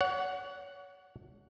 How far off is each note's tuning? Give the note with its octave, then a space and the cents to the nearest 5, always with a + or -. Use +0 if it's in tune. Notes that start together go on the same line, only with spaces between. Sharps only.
C#5 +35 F#5 +0